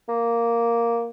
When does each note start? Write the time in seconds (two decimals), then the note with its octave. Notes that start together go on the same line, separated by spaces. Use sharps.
0.09 A#3